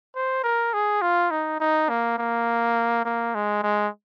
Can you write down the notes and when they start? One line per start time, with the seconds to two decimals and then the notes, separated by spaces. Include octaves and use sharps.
0.15 C5
0.44 A#4
0.73 G#4
1.02 F4
1.31 D#4
1.60 D#4
1.89 A#3
2.18 A#3
3.05 A#3
3.35 G#3
3.63 G#3